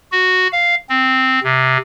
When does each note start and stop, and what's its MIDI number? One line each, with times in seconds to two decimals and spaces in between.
0.12 0.47 66
0.52 0.75 77
0.89 1.39 60
1.43 1.77 48